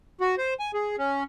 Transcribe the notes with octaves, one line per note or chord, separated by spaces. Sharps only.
F#4
C5
G#5
G#4
C#4